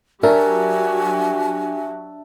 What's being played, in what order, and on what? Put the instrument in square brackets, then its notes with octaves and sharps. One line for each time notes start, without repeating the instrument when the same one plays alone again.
[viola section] F#3 F#4 G4 [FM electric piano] D4 E5 A5 [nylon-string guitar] A#4 [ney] G#5